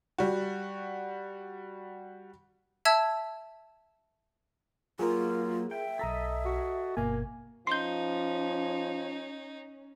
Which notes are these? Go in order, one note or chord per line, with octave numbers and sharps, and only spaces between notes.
G3 F#4
E5 A5 E6 G#6
F#3 A#3 F4 G#4 A#4
E5 G5
B1 A4 D#5 A#5 B6
F#4
G1 B2 A#3 G#5
F3 C#4 D#4 C6 G6